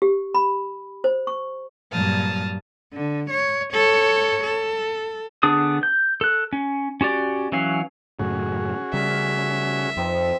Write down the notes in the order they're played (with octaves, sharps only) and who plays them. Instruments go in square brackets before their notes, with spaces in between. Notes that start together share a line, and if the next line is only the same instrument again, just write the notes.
[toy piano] G4
B5
C5
C#6
[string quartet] G2 A#2 F#3 A5 D#6 F6
[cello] D3
C#5
A4 C#5
A4
[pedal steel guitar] D3 B3 D4 G#4 D#6
G6
A4 F#6
C#4
C#4 F#4 G4 D5
E3 F#3 C#4 F5
[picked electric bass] F#2 A2 C#3 [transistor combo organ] C#4 F#4 G#4
[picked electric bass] C#3 G3 [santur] A#4 D5 F5 [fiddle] E5
[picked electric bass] F2 [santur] C4 D#4 B4